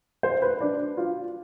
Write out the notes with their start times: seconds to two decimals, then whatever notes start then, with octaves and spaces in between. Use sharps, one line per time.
0.23 C5
0.42 B4
0.60 D4
0.97 F4